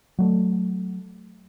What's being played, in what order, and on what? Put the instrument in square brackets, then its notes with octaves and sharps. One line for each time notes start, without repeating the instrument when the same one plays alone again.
[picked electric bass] F#3 A3